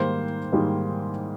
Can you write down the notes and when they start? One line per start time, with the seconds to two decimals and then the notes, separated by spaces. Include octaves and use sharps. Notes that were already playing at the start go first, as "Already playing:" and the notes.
Already playing: G#2 D#3 G3 A#3 C5
0.53 G#2 D#3 G3 A#3